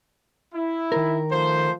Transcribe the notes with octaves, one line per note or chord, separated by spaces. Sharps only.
E4
D#3 A#4
F3 A3 C5